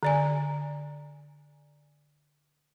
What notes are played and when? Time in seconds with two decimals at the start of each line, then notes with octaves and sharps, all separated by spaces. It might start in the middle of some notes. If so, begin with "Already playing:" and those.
0.03 D3 D5 G#5